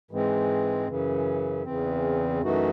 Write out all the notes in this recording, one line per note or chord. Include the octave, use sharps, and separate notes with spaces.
G#2 E3 G#3 C4
F#2 C#3 E3
E2 C#3 E3 C4
F#2 E3 A3 D#4 F#4